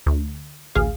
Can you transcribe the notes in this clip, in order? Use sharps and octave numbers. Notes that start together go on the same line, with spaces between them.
D2
A1 D2 G#4 F5